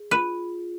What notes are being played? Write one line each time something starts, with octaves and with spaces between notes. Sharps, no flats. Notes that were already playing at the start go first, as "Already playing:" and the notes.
Already playing: G#4
F4 B4